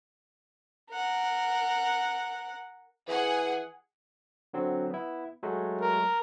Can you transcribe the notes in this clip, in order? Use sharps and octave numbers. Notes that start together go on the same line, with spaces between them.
A#4 F#5
E3 G#4 F#5
D3 F#3 C4
B3 E4
F#3 G#3 A3
A#4